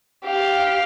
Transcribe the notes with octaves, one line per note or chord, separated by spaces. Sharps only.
G4 F5